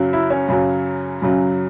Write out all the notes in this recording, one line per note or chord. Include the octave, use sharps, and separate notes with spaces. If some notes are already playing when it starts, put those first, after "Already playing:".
Already playing: F#2 C#3 F#3
E4
C#4
F#2 C#3 F#3
F#2 C#3 F#3